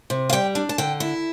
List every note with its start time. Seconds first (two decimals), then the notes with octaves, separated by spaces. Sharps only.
0.10 C3
0.29 F5
0.33 G3 G5
0.55 D4
0.69 A5
0.78 D3 G5
1.00 E4